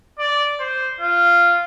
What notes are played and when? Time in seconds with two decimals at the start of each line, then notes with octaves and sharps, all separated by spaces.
0.19 D5
0.60 C5
1.01 F4